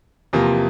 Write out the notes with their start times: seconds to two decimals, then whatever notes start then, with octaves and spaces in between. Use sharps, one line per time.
0.33 E2 C3 F3 A#3